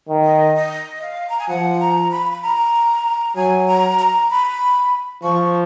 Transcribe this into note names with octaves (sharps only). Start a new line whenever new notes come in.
D#3
D#5
D#5
F5
A#5
G#5
F3 F#5
A#5
B5
B5
A#5
F#3 G#5
A#5
A#5
B5
F3 C#6